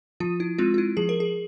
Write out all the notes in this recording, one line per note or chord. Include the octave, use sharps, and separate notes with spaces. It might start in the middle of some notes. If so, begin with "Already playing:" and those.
F3 F4
E4
G#3 C4 F4
F4
E4
F3 G#4
A#4
G#4